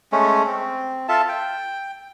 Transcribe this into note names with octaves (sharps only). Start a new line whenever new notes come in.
G#3 A3 C#4
C4
F4 A4 E5 A5
G5